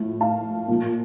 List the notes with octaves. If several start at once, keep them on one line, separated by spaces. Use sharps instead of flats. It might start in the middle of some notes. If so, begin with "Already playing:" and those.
Already playing: A2 F3
F5 A5
A#2 F3